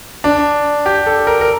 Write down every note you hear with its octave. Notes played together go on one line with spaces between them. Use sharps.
D4
G4
A4
A#4
A#4